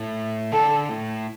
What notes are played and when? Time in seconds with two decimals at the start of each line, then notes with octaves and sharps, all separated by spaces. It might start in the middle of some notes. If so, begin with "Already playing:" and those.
Already playing: A2
0.52 D3 A4
0.89 A2